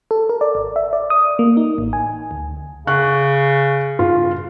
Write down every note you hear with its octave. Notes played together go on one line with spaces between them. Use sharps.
A4
A#4
D5
G#1
E5
D5
D#6
A#3
D#4
A1
G#5
D2
C#3 C#6 F#6
G2 F4